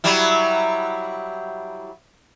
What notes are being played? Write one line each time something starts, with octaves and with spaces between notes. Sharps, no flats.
F#3 G3 E4